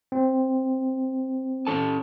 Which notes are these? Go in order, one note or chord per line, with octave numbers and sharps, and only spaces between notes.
C4
C#4 A4 A5